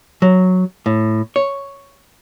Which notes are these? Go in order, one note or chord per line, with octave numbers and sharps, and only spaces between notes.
F#3
A2
C#5